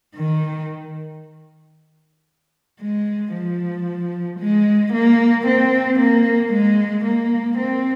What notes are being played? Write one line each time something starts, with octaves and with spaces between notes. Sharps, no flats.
D#3
G#3
F3
G#3
A#3
C4
A#3
G#3
A#3
C4